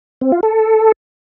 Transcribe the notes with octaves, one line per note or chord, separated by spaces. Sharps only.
C4
F4
A4